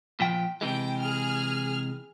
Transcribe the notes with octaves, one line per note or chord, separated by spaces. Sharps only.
A#2 F3 G5
C3 E3 G#3 G5
G#4 F6